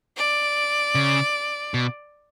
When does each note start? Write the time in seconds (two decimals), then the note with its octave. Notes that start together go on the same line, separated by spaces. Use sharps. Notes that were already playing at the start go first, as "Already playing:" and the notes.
0.17 D5
0.95 C#3
1.74 B2